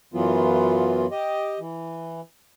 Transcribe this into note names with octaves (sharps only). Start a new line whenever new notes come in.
F#2 E3 F#3 B3 F4
G4 D#5
E3